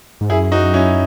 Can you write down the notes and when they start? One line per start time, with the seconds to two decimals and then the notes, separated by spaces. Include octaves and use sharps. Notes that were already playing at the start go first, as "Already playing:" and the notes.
0.21 G#2
0.30 F#2 E4 G#4
0.52 D#4 F#4
0.74 C#4 E4